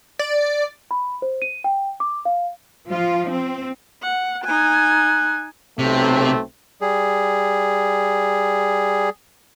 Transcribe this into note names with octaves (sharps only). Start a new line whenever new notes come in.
D5
B5
C5
D#7
G5
D6
F5
F3 F4
C4
F#5
D#4 G#5 F#6
B1 C3 A3 C4
G3 G#4